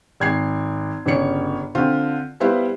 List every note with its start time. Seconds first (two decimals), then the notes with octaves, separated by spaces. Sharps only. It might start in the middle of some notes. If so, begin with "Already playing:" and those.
0.20 G#1 G#6 C7
1.06 G1 C#3 C#5 C#7
1.75 D3 C4 F4
2.40 G3 B3 E4 C5 F5